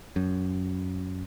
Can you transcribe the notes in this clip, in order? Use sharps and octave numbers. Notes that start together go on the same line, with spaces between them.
F#2